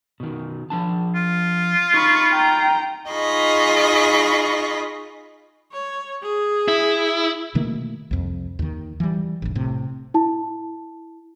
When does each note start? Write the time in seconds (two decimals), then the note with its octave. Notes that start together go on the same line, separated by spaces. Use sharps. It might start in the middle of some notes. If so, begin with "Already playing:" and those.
0.20 B2 D#3
0.70 F3 D4 A5
1.15 F4
1.94 D#4 B5 C#6
2.32 G5 A#5
3.10 D#4 F4 G#4 D#5 B5 C#6
5.72 C#5
6.22 G#4
6.68 E4
7.55 B2 D#3 A3 A#3
8.11 C2 F2
8.59 D#2 D#3
9.00 E3 G3
9.42 F1 A#1
9.55 A2 C3
10.14 E4 A5